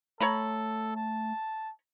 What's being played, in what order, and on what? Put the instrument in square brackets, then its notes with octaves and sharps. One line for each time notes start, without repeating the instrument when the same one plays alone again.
[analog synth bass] A3 [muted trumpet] A4 [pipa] C#5 A#5 B5
[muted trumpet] A5